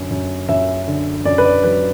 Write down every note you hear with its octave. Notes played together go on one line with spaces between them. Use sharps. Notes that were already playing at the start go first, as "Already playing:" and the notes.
Already playing: F#2 D3
F#2
F#2 E5
D3
F#2 D5
B4
D5
F#3 B4